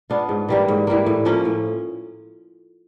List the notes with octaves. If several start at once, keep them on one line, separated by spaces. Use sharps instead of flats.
B3 D4 F4
G#2
E3 G3 A#3
G#2
E3 G3 A#3
A2
F3 A#3 C#4
A2